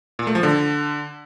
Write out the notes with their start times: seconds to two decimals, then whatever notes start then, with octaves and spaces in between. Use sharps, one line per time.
0.19 A#2
0.27 A3
0.35 F3
0.43 D3